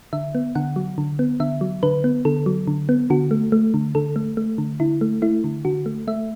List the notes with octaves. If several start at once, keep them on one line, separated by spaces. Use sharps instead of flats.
D3 E5
B3
D3 F#5
F#3
D3
B3
D3 E5
F#3
D3 B4
B3
D3 A4
F#3
D3
B3
D3 F#4
A3
A3
D3
D3 A4
A3
A3
D3
D3 E4
A3
A3 E4
D3
D3 F#4
A3
A3 E5